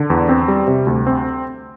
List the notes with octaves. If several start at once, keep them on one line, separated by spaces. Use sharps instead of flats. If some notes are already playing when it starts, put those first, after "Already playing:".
Already playing: D3
E2
C4
G3
C3
D2
C4